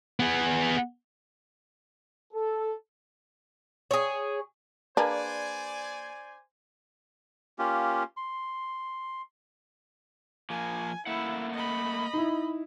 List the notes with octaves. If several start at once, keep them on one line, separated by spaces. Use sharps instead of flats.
B3 G#4
A4
G#4 C#5
A#3 D4 G#4 B4 C5 D5 G#5
A#3 C#4 F4 G4
C6
F3 A#3 G#5
A3 A#3 E4 F#5
D#5 B5
D#4 E4